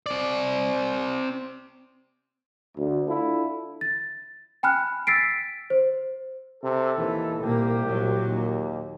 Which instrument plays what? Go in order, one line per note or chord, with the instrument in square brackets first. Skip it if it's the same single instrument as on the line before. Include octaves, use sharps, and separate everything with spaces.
[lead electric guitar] C4 D5
[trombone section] D2
D4 E4 F4 A4
[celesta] A6
G5 G#5 B5 F6 F#6
E6 A6 B6 C7 D7
C5
[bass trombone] C3 [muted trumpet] A4
[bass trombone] D#2 [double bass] E3
[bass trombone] C2 [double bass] A#2 A#3 [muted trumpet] G4
[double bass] A#2 F#3
[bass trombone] D#2